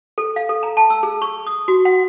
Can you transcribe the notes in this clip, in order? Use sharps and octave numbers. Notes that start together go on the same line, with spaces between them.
A4
F5
A4
A#5
A5
E6
G#4
C#6
D#6
F#4
F#5